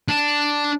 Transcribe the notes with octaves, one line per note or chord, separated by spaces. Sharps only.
D4